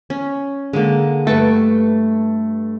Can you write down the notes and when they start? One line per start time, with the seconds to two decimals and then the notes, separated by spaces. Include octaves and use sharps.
0.10 C#4
0.73 D3 G#3 A#3
1.27 G2 A3 B4 G5 A5 C#6